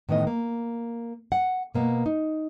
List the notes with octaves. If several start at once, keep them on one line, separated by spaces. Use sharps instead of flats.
A2 D#3 E3 B3 D#5
A#3
F#5
B2 A#3 B3
D#4